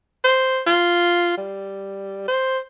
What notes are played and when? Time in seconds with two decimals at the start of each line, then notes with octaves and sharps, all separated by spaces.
0.24 C5
0.67 F4
1.37 G3
2.28 C5